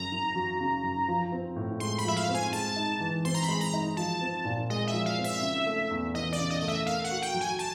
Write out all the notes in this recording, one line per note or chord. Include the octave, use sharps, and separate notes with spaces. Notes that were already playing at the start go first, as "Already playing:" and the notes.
Already playing: F#2 C#3 A#5
F#2
F#3
C#3
F#2
F3
C4
A2
G#3 C6
B5
F3 E5
F5
C4
G#5
G#3 A5
D#4
E3
C4 C6
A#5
B5
G#3
A#5
D#4
F3 A5
C4
A#2
G#3 D#5
E5
F3
F5
C4
E5
C#3
A3
E2
E3 D#5
D5
C#3
D#5
A3 D#5
E5
A#3 F5
F#5
F#4
G5
F#3
G#5
A5